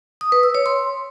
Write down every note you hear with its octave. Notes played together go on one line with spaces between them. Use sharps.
D#6
B4
E6
C#5
C6